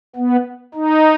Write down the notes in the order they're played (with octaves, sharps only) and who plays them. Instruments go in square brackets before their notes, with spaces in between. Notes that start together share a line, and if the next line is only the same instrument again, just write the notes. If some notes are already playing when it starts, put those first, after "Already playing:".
[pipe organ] B3
D#4